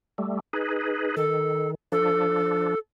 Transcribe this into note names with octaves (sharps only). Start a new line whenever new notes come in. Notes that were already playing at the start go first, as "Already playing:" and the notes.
G3 A3
D#4 G#4 B4
D#3 A4
F3 D4 A4